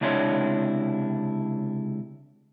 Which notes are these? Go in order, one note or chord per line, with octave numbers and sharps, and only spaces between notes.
C#2 C3 D4 E4 C#5 C6